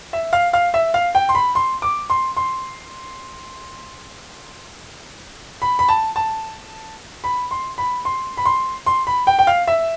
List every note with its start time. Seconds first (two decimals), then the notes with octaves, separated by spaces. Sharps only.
0.13 E5
0.33 F5
0.53 F5
0.74 E5
0.94 F5
1.15 G5
1.29 C6
1.35 B5
1.55 C6
1.82 D6
2.10 C6
2.37 C6
5.62 B5
5.79 B5
5.89 A5
6.16 A5
7.24 B5
7.51 C6
7.78 B5
8.05 C6
8.37 B5
8.45 C6
8.86 C6
9.07 B5
9.27 G5
9.39 G5
9.47 F5
9.67 E5